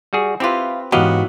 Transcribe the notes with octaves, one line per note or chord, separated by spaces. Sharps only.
G3 F#4 G#4
C4 E4 F4 G4 B4
G#2 E3 F#3 B3 F#4 G4 D#5 F5